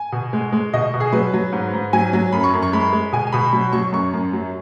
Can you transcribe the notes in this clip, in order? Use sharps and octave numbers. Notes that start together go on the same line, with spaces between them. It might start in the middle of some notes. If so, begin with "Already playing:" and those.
Already playing: G#5
B2
G#3
G#3
B2 D#5
B2
G#4
F#3 B4
F#3
G#2
G#2
F#3 G#5
F#3
F#2 B5
C#6
F#2
C#6
G#3 B5
G#3
B2 G#5
G#5
B2 B5
F#3 B5
F#3 C#6
F#2 C#6
F#2
F#3